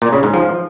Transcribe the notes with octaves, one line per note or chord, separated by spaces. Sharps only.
A#2
C#3
G#2
F3